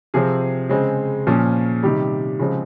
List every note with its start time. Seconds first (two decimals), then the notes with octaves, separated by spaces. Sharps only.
0.14 C3 F3 C4 G#4
0.69 C#3 G#3 C4
1.27 A#2 F3 A#3 C#4
1.83 C3 D#3 G3 G4
2.39 C#3 F3 G#3 C4